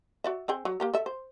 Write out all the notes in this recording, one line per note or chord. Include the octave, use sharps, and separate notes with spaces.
F#4 D5 E5
C4 G#4 G5
F#3
A#3 G4 A#4
A4 E5
C5